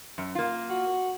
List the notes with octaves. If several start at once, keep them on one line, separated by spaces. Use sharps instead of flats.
F#2
A#3 F4
F#4